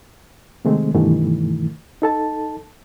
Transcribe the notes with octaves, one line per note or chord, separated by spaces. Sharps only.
C3 D#3 G#3 A3 C4
G2 B2 D#3 E3 A3
D#4 A4 A5